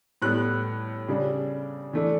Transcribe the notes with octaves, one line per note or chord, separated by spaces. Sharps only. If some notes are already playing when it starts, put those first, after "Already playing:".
A2 G3 B3 F#6
C#3 G3 D4
E3 A3 D4